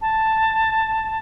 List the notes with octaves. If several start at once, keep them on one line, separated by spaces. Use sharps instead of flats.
A5